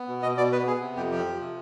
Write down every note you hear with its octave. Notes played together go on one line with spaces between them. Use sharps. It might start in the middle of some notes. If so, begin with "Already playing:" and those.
Already playing: B3
B2
B2 D#5
B2 D5
B3 B4
B3 G#4
C3
F2 G4
F3 G4
F3
C3